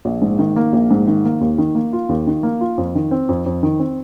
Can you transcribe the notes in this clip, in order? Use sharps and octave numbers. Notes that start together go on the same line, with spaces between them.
A#1
G#2
D#3
A#3
A#1
G#2
D#3
A#3
D#2
D#3
A#3
F4
D#2
D#3
A#3
F4
F2
D#3
C4
F2
F2
D#3
C4